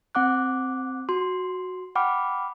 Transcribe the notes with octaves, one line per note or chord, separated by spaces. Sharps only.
C4 F#5 D6 F#6
F#4 C6
F#5 G5 B5 D6 F6